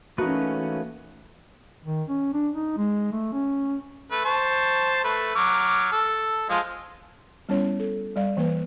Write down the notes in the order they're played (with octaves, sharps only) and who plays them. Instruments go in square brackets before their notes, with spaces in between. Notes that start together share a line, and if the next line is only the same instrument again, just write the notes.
[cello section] E3 C#4 [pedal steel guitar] A3 A#3 B4 [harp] D#4 F#4
[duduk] D#3
C#4
D4
D#4
G#3
A3
C#4
[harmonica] A3 B4
C5 A5 C#6
A3 B4
F#3 D6 F6
A4
F3 G#3 F4
[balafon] G3 B3 C#4 E4 C#5
A4
G3 D5 F5
E3 A#3 B4